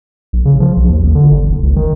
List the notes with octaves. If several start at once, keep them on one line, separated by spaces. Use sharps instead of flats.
A#1
C#3
F3
B1
D#2
A1
D3
G1
F#1
C#2
D#3